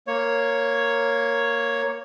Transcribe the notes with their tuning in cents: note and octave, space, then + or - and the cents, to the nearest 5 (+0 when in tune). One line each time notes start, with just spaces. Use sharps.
A#3 +0 C#5 +0